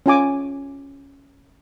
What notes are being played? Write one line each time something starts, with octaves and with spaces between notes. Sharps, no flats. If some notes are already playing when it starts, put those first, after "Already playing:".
C#4 F4 G#5 D6